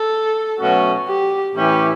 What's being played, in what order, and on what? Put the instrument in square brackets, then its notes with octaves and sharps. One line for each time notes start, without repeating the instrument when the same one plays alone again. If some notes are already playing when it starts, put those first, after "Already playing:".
Already playing: [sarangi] A4
[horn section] B2 F#3 A3 C#4 F#4
[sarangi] G4
[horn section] A2 E3 A3 C#4 G4 [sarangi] E4